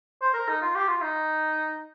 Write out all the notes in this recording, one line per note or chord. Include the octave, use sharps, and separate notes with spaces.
C5
A#4
D#4
F4
G4
F4
D#4